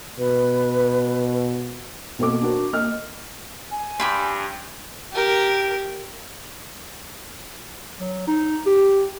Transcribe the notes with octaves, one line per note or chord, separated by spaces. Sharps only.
B2 B4
B2 A#3 C4 A4 D6
D4 F#4 A#4
A#3 D#5 F6
G#5
G2 G4 B5 C6
G4 A#4
F#3
D#4
G4